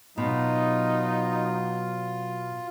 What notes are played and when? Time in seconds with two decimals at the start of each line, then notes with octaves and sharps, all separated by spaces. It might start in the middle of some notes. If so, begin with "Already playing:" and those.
0.18 B2 F#3 D#4 F4